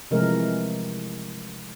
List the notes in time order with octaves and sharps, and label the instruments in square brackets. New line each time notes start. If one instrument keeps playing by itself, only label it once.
[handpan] C3 E3 F3 G#3 A3 A#4